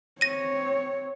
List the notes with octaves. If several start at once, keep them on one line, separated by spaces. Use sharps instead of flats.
C4 C#5 A#6 D#7